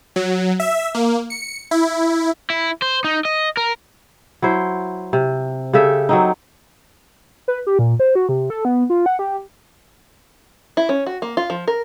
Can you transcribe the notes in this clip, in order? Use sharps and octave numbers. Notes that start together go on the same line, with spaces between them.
F#3
E5
A#3
C#7
E4
E4
C5
D#4
D#5
A#4
F#3 E4 C5
C3
C#3 G4 A4 E5
F#3 C4 D#4
B4
G4
A#2
C5
F#4
C3
A4
B3
F4
F#5
G4
E4
C#4
F#4
A#3
F4
F3
A#4